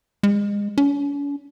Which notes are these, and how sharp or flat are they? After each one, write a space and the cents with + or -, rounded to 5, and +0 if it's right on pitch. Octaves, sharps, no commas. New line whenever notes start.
G#3 -30
C#4 +45